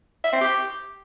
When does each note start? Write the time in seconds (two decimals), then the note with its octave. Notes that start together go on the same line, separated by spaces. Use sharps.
0.24 E5
0.32 C4
0.41 G4